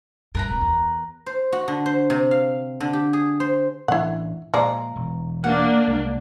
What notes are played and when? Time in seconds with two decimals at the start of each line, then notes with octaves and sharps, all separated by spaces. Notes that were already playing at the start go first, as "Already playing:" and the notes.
0.35 A#1 G2 A#4 B4 A#5
0.49 D1
0.61 E2
1.26 C5
1.52 F#4
1.68 D3
1.86 C5
2.10 C3
2.31 F5
2.80 D3
2.93 G4
3.13 G#4
3.40 C5
3.88 A2 E3 D4 E4 F#5
4.54 A#2 F3 G#3 D5 A#5
4.96 E1
5.44 A#3 D4 F#5
5.87 C2 G#3